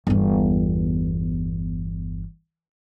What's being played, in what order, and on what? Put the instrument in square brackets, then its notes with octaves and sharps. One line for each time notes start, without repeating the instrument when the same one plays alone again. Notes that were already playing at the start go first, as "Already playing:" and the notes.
[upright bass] G1 E2